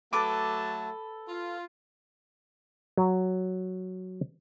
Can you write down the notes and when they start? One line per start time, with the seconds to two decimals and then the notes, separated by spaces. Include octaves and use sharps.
0.13 F#3 A3 A4 B4 A5 D6
1.28 F4
2.97 F#3